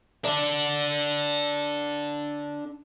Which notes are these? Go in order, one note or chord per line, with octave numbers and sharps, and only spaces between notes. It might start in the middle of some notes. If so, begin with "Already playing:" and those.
D4 A4